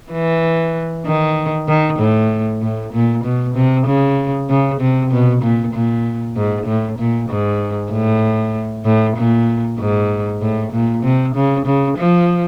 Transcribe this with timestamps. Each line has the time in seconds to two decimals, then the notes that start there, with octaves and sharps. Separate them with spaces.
0.12 E3
1.06 D#3
1.68 D#3
1.99 A2
2.62 A2
2.93 A#2
3.24 B2
3.55 C3
3.87 C#3
4.49 C#3
4.80 C3
5.11 B2
5.43 A#2
5.74 A#2
6.36 G#2
6.67 A2
6.99 A#2
7.30 G#2
7.92 A2
8.85 A2
9.17 A#2
9.79 G#2
10.41 A2
10.73 A#2
11.03 C3
11.35 C#3
11.66 C#3
11.98 F3